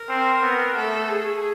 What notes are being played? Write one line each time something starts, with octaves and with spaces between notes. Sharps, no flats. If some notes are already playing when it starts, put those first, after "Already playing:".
Already playing: A#4
C4
B3
A3 A4
G#4